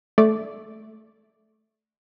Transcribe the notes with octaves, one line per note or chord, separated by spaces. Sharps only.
A3 D5